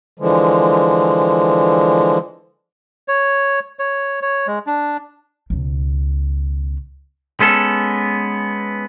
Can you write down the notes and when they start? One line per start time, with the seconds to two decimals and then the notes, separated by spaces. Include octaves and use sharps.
0.19 D3 E3 F3 G#3
3.08 C#5
3.79 C#5
4.22 C#5
4.47 G#3
4.67 D4
5.50 C#2 B2
7.40 G#3 B3 C#4 A4